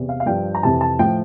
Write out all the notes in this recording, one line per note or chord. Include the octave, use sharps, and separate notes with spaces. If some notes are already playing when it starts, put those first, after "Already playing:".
Already playing: E2 C3
F5
F5
G2 F3 G5
A#5
F2 C3 E3 A5
A5
A2 F3 G5